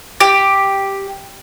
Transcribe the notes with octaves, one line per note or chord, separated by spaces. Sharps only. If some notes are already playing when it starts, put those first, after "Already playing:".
G4